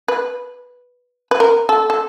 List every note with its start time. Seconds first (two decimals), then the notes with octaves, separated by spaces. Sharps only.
0.08 B4
1.31 B4
1.40 A#4
1.69 A4
1.90 A4